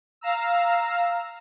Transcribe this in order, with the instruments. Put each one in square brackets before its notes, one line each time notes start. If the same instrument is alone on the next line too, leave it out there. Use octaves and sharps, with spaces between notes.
[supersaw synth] F5 A#5 E6